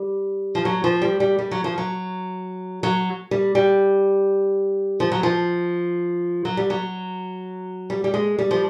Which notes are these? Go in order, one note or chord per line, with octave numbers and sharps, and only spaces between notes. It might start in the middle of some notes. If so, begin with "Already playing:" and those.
Already playing: G3
F3
F#3
F3
G3
G3
G3
F#3
F3
F#3
F#3
G3
G3
F3
F#3
F3
F#3
G3
F#3
G3
G3
G#3
G3
F3